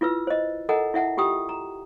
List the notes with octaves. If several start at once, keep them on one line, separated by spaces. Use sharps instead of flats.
E4 F4 B4 E6
C5 D#5
A4 A#4 D#5 F#5 G#5 A#5
E4 E5 F#5 A5
F4 G4 G5 D#6
A#5